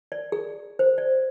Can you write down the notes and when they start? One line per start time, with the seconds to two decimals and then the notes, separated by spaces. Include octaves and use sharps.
0.12 D5
0.32 G#4
0.79 C5
0.98 D5